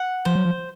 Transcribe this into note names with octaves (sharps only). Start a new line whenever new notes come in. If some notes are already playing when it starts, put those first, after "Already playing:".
Already playing: F#5
F3 C5
F#3
F3